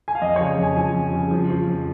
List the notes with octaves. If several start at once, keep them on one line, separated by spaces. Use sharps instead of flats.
G#5
F5
F2 D#5
C#3 C#5
F2 G#5
F3 G#5
F2
C#3
F3
F3
F2